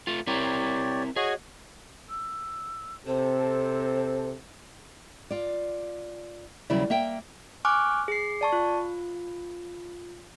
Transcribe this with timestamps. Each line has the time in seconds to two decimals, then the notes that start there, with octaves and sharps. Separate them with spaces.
0.07 A3 F4
0.27 C4 E4 G4 A#4 C#5 D5
1.16 F#4 G#4 C#5 D#5
2.09 E6
3.07 C3 C4 A4 C5
5.31 F4 D5
6.70 D#2 C#3 F#3 G3 E4 D5
6.90 A#3 E5 G5
7.65 G#5 C#6 D6 F6 F#6
8.08 G#4 C7
8.41 D5 A5 C#6
8.53 F4